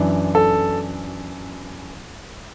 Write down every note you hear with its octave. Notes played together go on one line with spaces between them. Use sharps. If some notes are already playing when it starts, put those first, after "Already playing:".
Already playing: F#2 E3 D4
A4